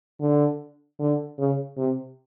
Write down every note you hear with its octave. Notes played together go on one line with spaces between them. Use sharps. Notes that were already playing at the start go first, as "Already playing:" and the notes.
D3
D3
C#3
C3